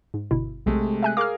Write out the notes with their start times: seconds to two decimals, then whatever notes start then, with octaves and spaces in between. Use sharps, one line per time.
0.14 G#2
0.31 G1 B2 E4
0.66 B1 C3 G#3 A3
1.03 E5 G#5 F#6
1.17 G#4 A#4 F5 D6 F6